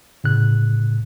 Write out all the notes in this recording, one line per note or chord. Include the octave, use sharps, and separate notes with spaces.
A2 C#3 F#6